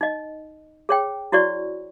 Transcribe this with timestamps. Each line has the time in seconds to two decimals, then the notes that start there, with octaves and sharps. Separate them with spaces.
0.01 D#4 D#5
0.89 G#4 C#5 G5
1.32 E4 F#4 C#5 D5 C#6